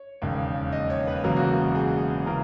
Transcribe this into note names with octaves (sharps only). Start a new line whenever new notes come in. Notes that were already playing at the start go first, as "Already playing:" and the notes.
Already playing: C#5
E1 D#2 C#3
D#5
C#5
B4
E1 E2 C#3 F#3 A#3 A#4
F#4
F#4
G#4
C#3 E3 A#4